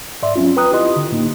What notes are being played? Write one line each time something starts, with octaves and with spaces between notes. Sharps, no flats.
G#2 D5 E5 C6
F#3 C4 C#4 F4
B4 G5 A#5 D#6 F#6
E4 F4 G4 D#5 C6
D3
A2 A#3 D#4